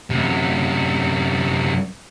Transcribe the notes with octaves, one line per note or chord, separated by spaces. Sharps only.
F#2 C3